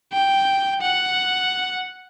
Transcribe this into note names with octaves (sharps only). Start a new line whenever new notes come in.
G5
F#5